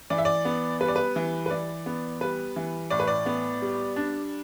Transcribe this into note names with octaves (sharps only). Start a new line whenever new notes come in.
E3 D5
E5
D5
B3
G3 B4
D5
B4
E3
B4
E3 D5
B3
G3 B4
E3
A2 D5
B4
D5
B3
G3
D4